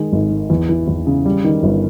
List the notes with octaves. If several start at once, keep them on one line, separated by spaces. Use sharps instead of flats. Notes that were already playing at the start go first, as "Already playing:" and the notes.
Already playing: D#3 G#3
G#1
G#2
E2
E3
E2
C#3
G3
D#3
G1